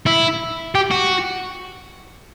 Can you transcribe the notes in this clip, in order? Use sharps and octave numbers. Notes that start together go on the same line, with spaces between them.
E4
G4
F#4